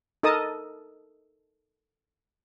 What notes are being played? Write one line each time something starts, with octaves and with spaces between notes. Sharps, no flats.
D#4 A4 A#4 D#5 A5 D#6